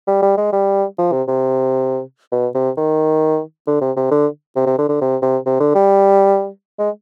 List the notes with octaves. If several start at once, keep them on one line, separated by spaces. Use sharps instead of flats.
G3
G3
G#3
G3
F3
C3
C3
B2
C3
D#3
D3
C3
C3
D3
C3
C3
D3
D3
C3
C3
C3
D3
G3
G#3